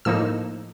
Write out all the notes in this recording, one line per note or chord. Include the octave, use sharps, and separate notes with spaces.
A2 F3 A#3 D#4 E6